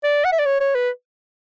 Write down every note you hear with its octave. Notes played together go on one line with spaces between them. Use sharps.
D5
F#5
E5
D5
C#5
C#5
B4